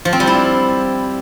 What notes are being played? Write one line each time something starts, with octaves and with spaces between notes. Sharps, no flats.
F3
C4
G3
E4